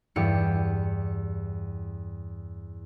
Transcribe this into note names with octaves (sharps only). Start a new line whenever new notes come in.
E2 G2 E4 G4 D5 C#7